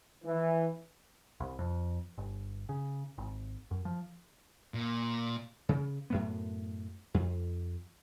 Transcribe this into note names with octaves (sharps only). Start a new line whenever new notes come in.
E3
C2
F2
G1
C#3
G#1
F#2
F3
A#2
C#3
F#2 A2 B3
F2